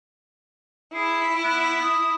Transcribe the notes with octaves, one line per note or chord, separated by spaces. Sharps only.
E4 G#4
B3
D#6